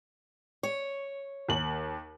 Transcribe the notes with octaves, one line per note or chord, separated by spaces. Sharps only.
C#5
D#2 F#7